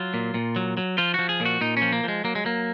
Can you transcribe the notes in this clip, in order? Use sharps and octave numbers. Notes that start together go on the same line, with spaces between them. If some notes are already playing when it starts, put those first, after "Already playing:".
Already playing: F#3 F4
A#2
A#2
F#3
F#3
F3 F4
F3 F#4
G#4
A#2 F#4
A#2 D#4
F3 C#4
A#3
F3 G#3
F#3 A#3
G#3
F#3 A#3